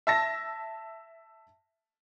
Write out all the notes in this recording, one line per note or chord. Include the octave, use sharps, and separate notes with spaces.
E5 A5 A#6